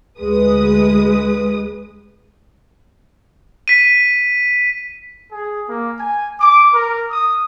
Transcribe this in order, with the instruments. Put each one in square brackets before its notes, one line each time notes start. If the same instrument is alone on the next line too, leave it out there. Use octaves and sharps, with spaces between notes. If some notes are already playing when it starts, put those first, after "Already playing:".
[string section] D2 G#3 B4 D#6
[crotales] B6 D#7
[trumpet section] G#4
A#3
G#5
D6
A#4
D#6